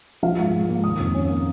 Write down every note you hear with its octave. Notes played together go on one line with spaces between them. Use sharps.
F3 F5
G#2
G#2
A#3
D#3 D#6
F2
C#4
A#3